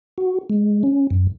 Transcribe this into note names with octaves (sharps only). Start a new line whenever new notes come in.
F#4
G#3
C#4
F#2